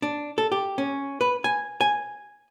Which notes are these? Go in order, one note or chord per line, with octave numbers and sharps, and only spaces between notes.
D4
A4
G4
C#4
B4
G#5
G#5